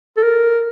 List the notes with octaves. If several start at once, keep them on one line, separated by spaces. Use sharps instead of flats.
A4
A#4